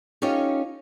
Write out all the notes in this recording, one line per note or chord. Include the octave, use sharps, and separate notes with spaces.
C#4 D#4 F4 G4 A4 C#5